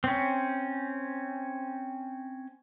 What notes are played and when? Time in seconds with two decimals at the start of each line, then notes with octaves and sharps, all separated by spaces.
0.04 C4 C#4